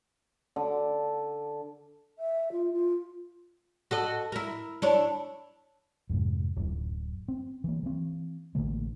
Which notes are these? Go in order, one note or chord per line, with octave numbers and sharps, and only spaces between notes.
D3
E5
F4
F4
F#4 A4 D#5
E4 A#4
D4 E4 C#5
F2 G#2 C3
D1 F#2
C4
E3 A#3
E3 C4
A1 D3 A3 A#3